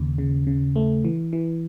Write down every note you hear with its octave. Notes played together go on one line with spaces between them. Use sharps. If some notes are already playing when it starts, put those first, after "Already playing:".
Already playing: D#2 C#3
C#3
C#3
A3
E3
E3